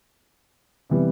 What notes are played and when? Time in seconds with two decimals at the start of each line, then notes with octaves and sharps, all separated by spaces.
0.90 C3 E3 G3 B3